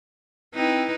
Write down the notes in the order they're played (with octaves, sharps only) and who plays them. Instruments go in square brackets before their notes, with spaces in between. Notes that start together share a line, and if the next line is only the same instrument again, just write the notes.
[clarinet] C4 [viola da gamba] D#4 E4 B4